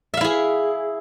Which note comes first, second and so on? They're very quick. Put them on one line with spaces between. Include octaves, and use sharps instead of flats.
E5 F5 E4 G#4